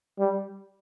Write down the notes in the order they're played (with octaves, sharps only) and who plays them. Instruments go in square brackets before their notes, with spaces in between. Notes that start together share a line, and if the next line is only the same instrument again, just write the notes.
[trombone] G3